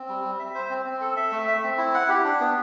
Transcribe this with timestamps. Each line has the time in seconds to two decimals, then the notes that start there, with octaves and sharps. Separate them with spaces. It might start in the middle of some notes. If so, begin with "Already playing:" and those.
Already playing: C4
0.09 G3
0.24 G3
0.39 E5
0.55 C5
0.70 C4
0.86 C4
1.01 A4
1.17 E5
1.32 A3
1.48 E5
1.63 C4
1.78 E4
1.94 F#5
2.09 G4
2.24 D4
2.40 B3